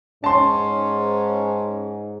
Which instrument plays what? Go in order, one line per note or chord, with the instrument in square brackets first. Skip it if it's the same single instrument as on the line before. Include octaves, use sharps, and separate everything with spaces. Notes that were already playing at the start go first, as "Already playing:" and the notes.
[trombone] G#2 [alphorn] C#4 [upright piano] A5 C6